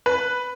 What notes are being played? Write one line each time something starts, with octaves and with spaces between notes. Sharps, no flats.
B4